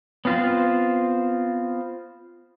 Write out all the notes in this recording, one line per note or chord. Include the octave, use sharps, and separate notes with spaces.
B3 C4 F4 C5